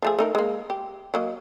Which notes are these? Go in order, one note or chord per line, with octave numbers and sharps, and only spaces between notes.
F3 A3 G#4
A3 D#4 A#4
G#3 A#3
G4
F#3 A#3 D#5